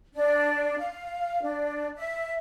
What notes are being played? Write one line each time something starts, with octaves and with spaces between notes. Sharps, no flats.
D4
F5
D4
E5